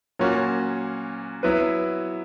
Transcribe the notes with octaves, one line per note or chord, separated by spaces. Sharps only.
A#2 F#3 A#3 C#4 F#4
F#3 B3 E4 B4